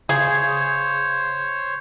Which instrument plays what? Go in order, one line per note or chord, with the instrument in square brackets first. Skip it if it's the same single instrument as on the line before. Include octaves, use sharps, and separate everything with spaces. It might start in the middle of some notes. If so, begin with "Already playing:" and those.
[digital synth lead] C#3 [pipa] G#4 [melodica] C5 C#5